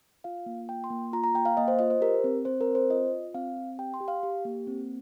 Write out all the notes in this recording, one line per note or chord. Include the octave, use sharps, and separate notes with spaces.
F4 F5
A#3
F4 G5
C6
A#3
F4 A#5
A#5
A#3 G5
F5
A#3 D#5
C5
F4 D#5
C5
G4 A#4
C4
C4 C5
A#4
C4
C5
F4 D#5
F4
C4 F5
C4
G4 G5
C6
G4
F5
G4
A#3
C4